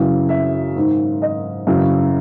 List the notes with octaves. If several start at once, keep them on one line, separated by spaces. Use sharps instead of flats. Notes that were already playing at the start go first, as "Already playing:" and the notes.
Already playing: F#2 C#3 E3
E5
G#2 D#3
D#5
F#2 C#3 E3